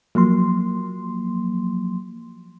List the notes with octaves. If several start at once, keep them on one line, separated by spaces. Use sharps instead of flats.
F3 F#3 A#3 C6